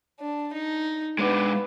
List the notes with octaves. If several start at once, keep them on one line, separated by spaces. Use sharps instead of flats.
D4
D#4
G#3 B3 D4